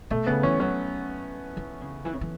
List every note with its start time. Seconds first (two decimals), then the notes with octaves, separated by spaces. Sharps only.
0.10 B2 A3
0.27 C#3 B3
0.43 E3 C#4
0.60 F#3 C#4
1.57 E3
1.81 C#3
2.05 E3
2.13 C#3
2.21 E3